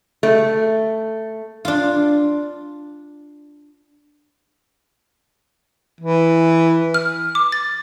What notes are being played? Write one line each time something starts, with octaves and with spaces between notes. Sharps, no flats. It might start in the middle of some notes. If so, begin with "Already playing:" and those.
A3
D4 F4
E3
F6
D6
A6